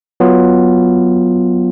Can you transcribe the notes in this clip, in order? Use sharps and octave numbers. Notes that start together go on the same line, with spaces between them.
F#3 B3 F4